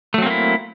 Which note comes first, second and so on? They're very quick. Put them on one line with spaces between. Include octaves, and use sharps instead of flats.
A3 F#3 C4 A#3 E4